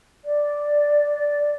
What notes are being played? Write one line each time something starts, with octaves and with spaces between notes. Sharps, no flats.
D5